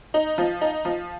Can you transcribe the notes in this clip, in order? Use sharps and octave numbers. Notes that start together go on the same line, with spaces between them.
D#4
F3
D#4
F3